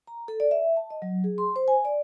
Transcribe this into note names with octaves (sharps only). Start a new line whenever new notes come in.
A#5
A4
D5
E5
A5
D#5
F#3
G#4
C6
C5
G#5
D5